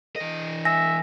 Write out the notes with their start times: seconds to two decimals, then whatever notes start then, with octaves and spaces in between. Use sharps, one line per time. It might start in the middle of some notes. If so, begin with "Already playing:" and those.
0.16 E3 D#5
0.65 E5 G#5 A#6